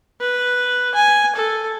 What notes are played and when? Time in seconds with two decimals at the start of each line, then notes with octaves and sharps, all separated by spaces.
0.21 B4
0.95 G#5
1.36 A4